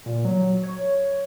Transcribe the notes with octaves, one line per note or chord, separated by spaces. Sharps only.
A#2
F#3
C#5